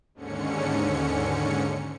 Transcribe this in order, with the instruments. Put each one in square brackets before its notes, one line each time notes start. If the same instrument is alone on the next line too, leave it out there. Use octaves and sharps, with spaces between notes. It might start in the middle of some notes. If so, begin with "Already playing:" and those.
[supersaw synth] D#2 G#2 D3 C#4 C#7